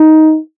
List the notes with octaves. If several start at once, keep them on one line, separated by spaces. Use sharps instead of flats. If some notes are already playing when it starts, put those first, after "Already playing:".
Already playing: D#4